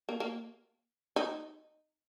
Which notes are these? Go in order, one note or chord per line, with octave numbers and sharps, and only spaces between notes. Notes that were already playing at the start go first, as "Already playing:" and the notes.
A#3
A#3
D#4